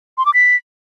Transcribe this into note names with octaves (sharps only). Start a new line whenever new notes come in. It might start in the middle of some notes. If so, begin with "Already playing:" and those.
C6
D6
B6